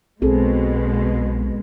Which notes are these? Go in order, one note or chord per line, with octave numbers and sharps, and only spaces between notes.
B1 B2 G#3 C4 G#4 A4